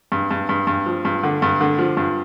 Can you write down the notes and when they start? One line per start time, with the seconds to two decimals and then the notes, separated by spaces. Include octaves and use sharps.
0.12 G2
0.31 G2
0.49 G2
0.67 G2
0.86 F3
1.05 G2
1.23 D3
1.42 G2
1.61 D3
1.78 F3
1.97 G2